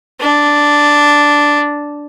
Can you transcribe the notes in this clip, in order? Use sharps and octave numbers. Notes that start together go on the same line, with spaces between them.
D4